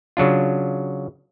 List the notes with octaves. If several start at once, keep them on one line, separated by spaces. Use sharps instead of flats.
C#3 F#3 D4 F4